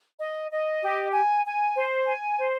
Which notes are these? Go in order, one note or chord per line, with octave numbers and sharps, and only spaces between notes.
D#5
D#5
G4
G#5
G#5
C5
G#5
C5